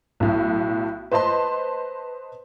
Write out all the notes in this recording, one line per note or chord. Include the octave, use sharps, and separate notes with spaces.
B1 A2
B4 C5 D#5 A5 C6